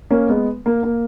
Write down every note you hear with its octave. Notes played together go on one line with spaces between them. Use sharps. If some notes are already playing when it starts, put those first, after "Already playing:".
A#3 C#4
G#3 B3
A#3
A#3